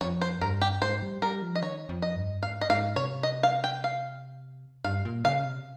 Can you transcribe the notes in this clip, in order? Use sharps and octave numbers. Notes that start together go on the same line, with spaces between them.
F2 C#5
C5
G2 A#4
G4
G#2 C5
G3
G3 A#4
F3
D#5
D#3 C#5
F2
D#5
G2
G#2 F5
D#5
G#2 F5
C3 C#5
D#5
F5
G5
F5
G2 F5
A#2
C#3 F5
C3